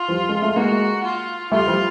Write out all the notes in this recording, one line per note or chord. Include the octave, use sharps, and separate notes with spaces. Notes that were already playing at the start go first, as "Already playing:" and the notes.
Already playing: F4
F3 G3
G#3
A3
G#3 A#3 F#4
F4
G3 A3 F4
F3 G3